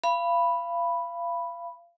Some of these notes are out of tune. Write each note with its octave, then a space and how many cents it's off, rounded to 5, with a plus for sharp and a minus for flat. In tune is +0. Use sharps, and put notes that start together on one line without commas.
F5 -30 B5 +0